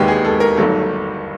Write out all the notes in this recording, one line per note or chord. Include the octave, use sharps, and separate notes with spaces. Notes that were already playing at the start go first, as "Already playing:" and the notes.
Already playing: E1 D#2 D#3 G#3 B3 G4
G#4
A4
A#4
G1 G2 D#3 F#3 A3 A4